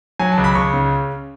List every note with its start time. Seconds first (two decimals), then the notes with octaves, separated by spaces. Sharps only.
0.19 F#3 G#5
0.32 A5
0.37 C#2
0.44 B5
0.55 C#2 C#6
0.74 C#3